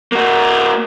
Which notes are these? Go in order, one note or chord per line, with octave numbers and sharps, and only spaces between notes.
A#3 F#4